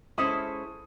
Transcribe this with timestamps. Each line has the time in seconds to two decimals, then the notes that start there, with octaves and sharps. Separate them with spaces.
0.18 G#3 C#4 E4 A4 C5 D#6